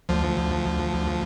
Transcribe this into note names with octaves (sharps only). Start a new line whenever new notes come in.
D2 F3